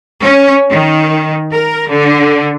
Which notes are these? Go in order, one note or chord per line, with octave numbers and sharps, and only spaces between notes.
C#4
D#3
A#4
D3